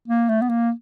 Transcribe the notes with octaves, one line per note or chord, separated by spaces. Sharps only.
A#3
A3
B3
A#3